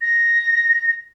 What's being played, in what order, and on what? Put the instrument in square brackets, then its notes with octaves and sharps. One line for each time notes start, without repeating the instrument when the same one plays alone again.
[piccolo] A#6